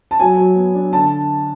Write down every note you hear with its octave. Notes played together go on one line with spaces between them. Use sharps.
A5
F#3 G#5
F#3
B3
D4
D3 A5